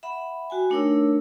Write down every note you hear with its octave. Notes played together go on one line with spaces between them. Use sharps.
E5 F#5 B5
F#4 G5 G#5
A3 D4 D#4 A#4 C#5 E6